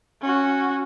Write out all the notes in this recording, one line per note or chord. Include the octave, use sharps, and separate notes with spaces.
C#4 F#4